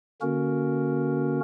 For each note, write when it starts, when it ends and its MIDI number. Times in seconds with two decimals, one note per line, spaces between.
0.22 1.40 50
0.22 1.40 58
0.22 1.40 61
0.22 1.40 66
0.22 1.40 70